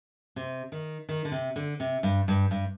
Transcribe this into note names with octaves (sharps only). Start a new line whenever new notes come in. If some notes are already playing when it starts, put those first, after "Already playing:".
C3
D#3
D#3
D3
C3
D3
C3
G2
G2
G2